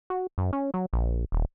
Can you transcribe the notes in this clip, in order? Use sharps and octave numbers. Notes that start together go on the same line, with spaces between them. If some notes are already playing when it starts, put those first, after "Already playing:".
F#4
F#2
C#4
F#3
A#1
D#1